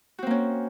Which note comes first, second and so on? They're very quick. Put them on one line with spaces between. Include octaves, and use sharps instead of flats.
F#4 C4 A#3 C#4